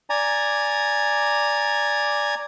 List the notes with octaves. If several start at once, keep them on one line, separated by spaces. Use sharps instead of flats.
D5 G#5 A#5